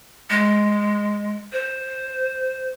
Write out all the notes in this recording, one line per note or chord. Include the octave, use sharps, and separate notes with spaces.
G#3
C5